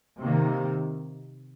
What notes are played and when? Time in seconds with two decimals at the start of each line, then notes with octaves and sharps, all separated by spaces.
0.19 C3 D#3 A#3